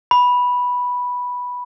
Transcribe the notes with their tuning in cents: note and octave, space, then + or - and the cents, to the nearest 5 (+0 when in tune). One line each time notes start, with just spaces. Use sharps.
B5 -5